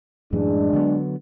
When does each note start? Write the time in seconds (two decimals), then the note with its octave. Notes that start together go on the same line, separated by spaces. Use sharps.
0.33 F#2 A2 E3 G#3 D4
0.73 D3 F#3 B3